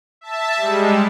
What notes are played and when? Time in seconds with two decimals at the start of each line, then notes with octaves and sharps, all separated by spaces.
0.21 E5 A5
0.56 G3 G#3